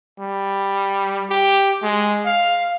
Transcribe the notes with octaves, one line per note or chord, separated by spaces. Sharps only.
G3
G4
G#3
F5